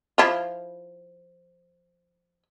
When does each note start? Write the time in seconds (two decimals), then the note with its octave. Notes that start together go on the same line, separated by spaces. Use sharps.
0.18 F3 E4 F4